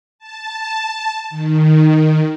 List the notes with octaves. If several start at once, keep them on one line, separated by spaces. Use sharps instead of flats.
A5
D#3